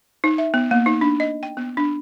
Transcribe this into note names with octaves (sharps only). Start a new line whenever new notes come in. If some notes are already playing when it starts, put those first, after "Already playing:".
D#4
E5
B3
A#3
D#4
D4
D#5
G5
B3
D4